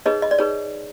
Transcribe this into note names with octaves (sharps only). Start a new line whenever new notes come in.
D#4 G#4 B4 C#5 D#5
D#5
D5
D#4 G#4 B4 C#5